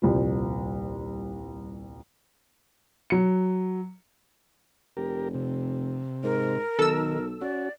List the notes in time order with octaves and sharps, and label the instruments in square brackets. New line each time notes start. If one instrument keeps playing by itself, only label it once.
[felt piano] D#1 C2 F3
[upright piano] F#3 C#7
[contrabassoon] F1 [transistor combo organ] G4 A#4
[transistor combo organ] C3
[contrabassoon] G#2 [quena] A#4
[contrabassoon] B1 [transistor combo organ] D#3 [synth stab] A4 E6
[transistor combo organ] C#4 F#4 [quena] D5